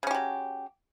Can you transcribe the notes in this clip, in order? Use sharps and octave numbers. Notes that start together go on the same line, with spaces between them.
C#3 F#3 C#4 G4